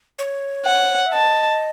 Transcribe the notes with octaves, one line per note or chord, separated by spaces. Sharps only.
C#5
F#5
E5
D#5 A5